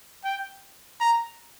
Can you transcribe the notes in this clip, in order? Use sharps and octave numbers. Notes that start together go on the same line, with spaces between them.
G5
A#5